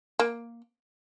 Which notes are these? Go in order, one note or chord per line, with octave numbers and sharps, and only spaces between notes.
A#3